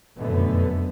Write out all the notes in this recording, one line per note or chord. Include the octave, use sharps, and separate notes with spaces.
F1 F#2 B2 D3 A3 B3